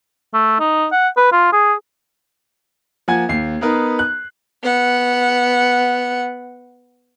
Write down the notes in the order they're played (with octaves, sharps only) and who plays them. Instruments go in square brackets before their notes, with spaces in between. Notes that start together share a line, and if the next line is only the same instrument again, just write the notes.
[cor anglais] A3
D#4
F#5
B4
F4
G#4
[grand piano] F3 A#3 F#5 G#5 G#6
D#2 C7
B3 D#4 A#4 B4
F#6
[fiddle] B3 F#5